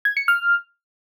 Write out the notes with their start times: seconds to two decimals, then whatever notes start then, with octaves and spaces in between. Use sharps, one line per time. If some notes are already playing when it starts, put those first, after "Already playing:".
0.05 G#6
0.17 C#7
0.28 F6